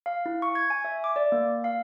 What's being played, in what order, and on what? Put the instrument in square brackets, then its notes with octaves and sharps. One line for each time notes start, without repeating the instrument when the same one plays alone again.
[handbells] F5
E4
C#6
G#6
G#5
E5
D6
D5
A#3
F5